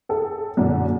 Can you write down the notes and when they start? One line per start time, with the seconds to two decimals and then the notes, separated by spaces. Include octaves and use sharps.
0.09 G#4 A4
0.57 F#2 A#2 D3